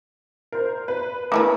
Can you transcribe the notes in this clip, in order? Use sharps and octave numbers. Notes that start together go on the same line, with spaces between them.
A#4 C5
B4
A3 A#3 E4 B4